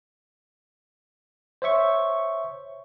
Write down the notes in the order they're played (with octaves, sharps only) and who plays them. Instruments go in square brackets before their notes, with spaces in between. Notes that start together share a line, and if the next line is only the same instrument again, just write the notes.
[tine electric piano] C5 C#5 E5 C#6